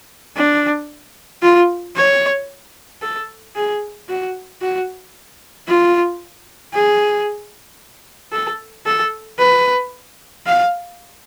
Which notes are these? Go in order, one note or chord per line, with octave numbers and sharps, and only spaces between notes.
D4
F4
C#5
A4
G#4
F#4
F#4
F4
G#4
A4
A4
B4
F5